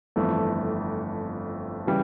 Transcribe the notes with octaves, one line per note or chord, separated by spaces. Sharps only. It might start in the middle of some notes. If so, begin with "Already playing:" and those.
G1 F2 E3 A3
C#3 E3 G3